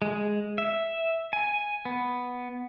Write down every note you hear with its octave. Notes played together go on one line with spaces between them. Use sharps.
G#3
E5
G#5
B3